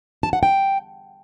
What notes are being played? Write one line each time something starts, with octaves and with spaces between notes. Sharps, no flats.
A5
F#5
G5